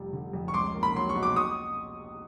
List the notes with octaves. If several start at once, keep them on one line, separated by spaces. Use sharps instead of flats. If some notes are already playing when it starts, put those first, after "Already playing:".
Already playing: F1 G3
D3
F2
C#6
C#2 C6 D6
A#3
B5
F#3 C6
C#6
B2
D6
C#6 D#6